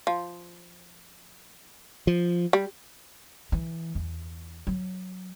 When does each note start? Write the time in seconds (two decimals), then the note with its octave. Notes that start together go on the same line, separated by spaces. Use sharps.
0.07 F3
2.07 F3
2.53 G3
3.52 E3
3.95 E2
4.67 F#3